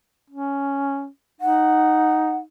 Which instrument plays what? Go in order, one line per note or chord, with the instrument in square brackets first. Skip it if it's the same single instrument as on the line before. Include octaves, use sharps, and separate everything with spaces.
[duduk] C#4
[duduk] D#4 [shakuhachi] F#5